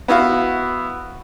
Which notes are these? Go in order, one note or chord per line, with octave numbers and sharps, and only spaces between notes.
B3 E4 F#4 F5